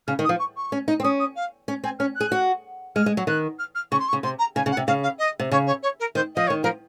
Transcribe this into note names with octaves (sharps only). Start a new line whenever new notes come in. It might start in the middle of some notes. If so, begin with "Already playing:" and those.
C#3 F6
D#3
D#6
F3
C#6
C#6
C#4
D#4
C4
C#4 D#6
D#6
F5
C#4
C4 G#5
C#4 F6
G#4 F#6
F#4
G#3 F6
G#3
F#3
D#3 F#6
F6
F6
C#3 C#6
C6
C#6
C#3
C3 C6
A#5
C#3 G#5
C#3
F#5
C3
C#3 F5
F5
D#5
C3
C#3 C#5
C#5
C#5
A#4
D#3 C5
F3 D#5
C#5
D#3
F3 A#4